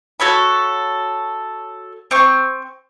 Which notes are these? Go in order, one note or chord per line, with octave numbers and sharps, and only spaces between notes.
F#4 A4 C#5 B5
C4 C#6